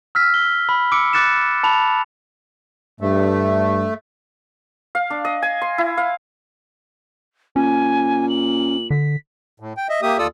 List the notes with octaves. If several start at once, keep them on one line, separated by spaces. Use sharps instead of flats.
E6 F6 B6
G7
B5
D6 E6 C#7 D7
D6 F#6 A6 C#7 E7
A5 B5 F7
G2 A3
F5
D4
D#5
G#5
C6
E4
F5
A#2 C#4 G#5
F#7
D3 B6
A2
G5
D#5 E5
A#3 G4 E5 D#6
D#2 F4 A4 D5 D#6 E6